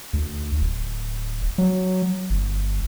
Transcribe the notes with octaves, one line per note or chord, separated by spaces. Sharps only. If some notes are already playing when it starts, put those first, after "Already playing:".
D2
D1
F#3
G1